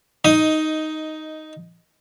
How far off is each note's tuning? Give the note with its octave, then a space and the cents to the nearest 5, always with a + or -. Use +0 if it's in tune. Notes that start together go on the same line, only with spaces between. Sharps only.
D#4 +0 D#5 +10